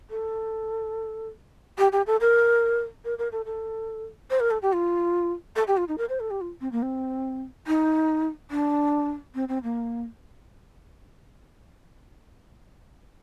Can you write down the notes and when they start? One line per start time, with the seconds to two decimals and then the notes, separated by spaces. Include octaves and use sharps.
0.10 A4
1.78 G4
1.92 G4
2.07 A4
2.21 A#4
3.05 A#4
3.18 A#4
3.32 A4
3.45 A4
4.30 C5
4.40 A#4
4.51 A4
4.62 G4
4.73 F4
5.56 A4
5.67 G4
5.77 F4
5.88 D#4
5.98 A#4
6.09 C5
6.20 A4
6.30 G4
6.41 F4
6.61 C4
6.72 A#3
6.82 C4
7.67 D#4
8.51 D4
9.35 C4
9.48 C4
9.63 A#3